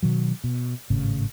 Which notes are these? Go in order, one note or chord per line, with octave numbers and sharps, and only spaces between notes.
B2 D#3 F#3
B2
G#1 A2 C#3